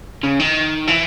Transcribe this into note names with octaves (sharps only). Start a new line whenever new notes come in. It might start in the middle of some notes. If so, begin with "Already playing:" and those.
C#3
D#3
E3